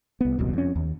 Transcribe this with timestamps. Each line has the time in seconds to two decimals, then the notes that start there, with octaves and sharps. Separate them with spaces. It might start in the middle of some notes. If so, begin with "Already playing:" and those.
0.21 C2 B3
0.39 D#1 C2 F#2 B2
0.53 F2 C#4
0.76 D#2